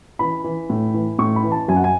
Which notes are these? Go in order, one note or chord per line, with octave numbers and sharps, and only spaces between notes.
E3 B5
E3
A2
E3
A2 C#6
B5
E3
A5
F#2 G#5
F#5
G#5